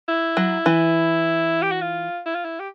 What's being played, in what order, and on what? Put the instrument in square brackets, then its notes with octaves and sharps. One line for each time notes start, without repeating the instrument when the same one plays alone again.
[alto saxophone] E4
[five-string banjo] F#3
E3
[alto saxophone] G4
F#4
F4
E4
F4
E4
G4